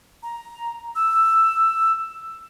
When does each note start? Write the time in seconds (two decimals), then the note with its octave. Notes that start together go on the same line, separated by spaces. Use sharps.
0.23 A#5
0.95 E6